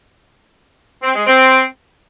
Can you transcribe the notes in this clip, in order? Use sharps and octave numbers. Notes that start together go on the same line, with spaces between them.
C4
G#3
C4